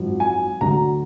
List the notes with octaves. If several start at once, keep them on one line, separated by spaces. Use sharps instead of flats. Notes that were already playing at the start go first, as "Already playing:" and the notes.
Already playing: G#1 F#2 F3
G#5
D2 D3 F#3 A#5